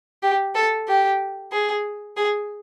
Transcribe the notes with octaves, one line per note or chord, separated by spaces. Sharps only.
G4
A4
G4
G#4
G#4